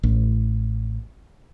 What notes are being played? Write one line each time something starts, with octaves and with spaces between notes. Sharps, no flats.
A1